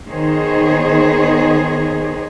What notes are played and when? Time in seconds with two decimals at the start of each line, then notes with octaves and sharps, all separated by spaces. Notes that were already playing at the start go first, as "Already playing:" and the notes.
0.10 D#3 B3 G#4 C5 C#5 D#5